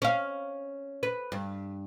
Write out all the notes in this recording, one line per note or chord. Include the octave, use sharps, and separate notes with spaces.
C#4 F5
B4
G2